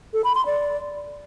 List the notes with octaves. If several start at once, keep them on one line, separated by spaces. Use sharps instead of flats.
A4
B5
C6
D5